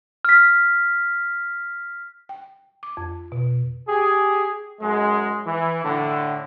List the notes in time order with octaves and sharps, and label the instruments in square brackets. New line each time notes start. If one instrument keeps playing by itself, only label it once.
[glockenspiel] F6 B6
[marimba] G5
D6
F2
B2
[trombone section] G4 G#4
F#2 G#3
E3
A2 D3